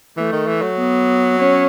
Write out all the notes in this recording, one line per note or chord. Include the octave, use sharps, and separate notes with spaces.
E3 A3
D#3
E3
F#3
B3
C#4